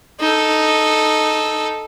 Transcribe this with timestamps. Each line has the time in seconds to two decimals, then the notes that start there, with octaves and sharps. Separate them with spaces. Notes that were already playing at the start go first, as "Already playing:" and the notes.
0.20 D#4 A4